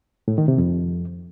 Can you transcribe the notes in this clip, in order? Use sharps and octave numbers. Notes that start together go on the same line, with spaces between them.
A2
D#3
C3
F2